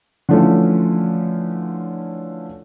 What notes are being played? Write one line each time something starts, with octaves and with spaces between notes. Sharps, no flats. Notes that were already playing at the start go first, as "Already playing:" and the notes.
D3 E3 F3 A3 C#4 F4